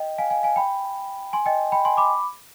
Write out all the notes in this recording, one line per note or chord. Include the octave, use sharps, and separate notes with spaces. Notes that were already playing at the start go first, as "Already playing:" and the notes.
Already playing: D#5 G5
F5 G#5
F5 G#5
F5 G#5
G5 B5
G#5 C6
D#5 G5
G5 B5
G#5 C6
B5 D6